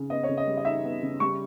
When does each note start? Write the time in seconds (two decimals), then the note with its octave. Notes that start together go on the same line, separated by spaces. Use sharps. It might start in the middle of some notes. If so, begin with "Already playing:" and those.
Already playing: C#3
0.10 B3 D#5
0.24 C#5
0.29 C#3
0.37 D#5
0.47 G3
0.57 D#5
0.65 D#4 E5
0.84 B3
1.02 C#3
1.20 G3 C#6